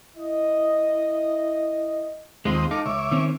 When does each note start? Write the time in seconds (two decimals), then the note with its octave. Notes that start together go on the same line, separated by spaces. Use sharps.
0.16 E4 D#5
2.45 D#2 G#3 C4 F4 D#6
2.71 D#4 A4 F5 D6
2.86 C#2 C#5 E5 D6
3.11 D#3 C4 C#4